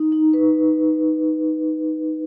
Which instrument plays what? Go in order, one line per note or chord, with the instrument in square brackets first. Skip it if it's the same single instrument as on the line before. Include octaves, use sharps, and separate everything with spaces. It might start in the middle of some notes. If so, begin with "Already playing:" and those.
Already playing: [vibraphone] D#4
D#4
B4